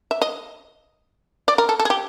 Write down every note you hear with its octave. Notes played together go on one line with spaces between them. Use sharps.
E5
D#5
D5
A#4
A4
A4
G#4
G4